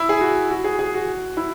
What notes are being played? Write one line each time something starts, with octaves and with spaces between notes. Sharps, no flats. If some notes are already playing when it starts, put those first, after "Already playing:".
Already playing: E4
G#4
F#4
F#4
G#4
G#4
F#4
E4